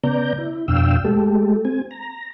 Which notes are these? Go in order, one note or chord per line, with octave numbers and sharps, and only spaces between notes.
C#3 B3 D5 A#5 G6
E4
F2 B2 D4 F5 G5 E6
G#3 A3 G4 A4
C4 G#5
A#5